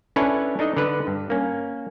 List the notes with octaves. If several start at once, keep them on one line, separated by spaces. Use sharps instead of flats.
C#4 D4 E4 A4 B4 C#5
D4 D#4 A4 D#5
D3 B4
G2
A#3 C#4